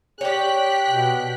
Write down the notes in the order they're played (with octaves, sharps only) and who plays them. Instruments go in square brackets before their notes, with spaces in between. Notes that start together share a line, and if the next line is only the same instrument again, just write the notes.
[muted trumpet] G4 [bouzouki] C#5 D5 [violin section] G5 F#6 B6
[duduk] B2